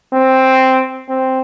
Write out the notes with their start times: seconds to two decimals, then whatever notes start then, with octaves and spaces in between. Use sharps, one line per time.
0.14 C4
1.10 C4